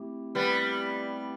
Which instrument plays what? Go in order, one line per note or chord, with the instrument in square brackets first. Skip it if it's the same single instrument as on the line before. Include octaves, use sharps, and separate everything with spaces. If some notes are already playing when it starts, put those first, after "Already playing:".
Already playing: [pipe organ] A3 C4 E4 G4
[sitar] G3 B3